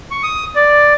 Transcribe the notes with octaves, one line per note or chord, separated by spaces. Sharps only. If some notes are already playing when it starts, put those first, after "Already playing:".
C#6
D#6
D5